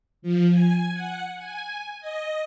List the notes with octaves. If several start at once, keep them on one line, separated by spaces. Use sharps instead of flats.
F3
G#5
F#5
G#5
D#5